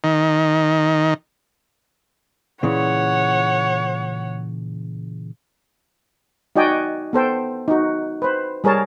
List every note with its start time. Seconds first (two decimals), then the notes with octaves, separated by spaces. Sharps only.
0.04 D#3
2.63 A#2 C#3 E3 C#5 F#5
6.56 D#4 F#4 D5 D#5 G5 G#5
7.13 B3 A4 C5 G5
7.68 D#4 F#4
8.22 B4 C5
8.64 G3 G#4 A#4 C#5 A5